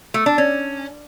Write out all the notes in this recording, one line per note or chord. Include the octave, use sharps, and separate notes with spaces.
A3
D4
C#4